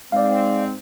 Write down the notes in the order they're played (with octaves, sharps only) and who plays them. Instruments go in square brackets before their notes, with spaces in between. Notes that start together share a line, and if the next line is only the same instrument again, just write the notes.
[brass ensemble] G#2 C4 [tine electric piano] D5 F5